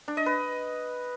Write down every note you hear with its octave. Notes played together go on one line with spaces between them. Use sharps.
D4
D#5
B4